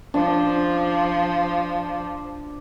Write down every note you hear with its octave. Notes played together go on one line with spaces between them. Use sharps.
F3 D4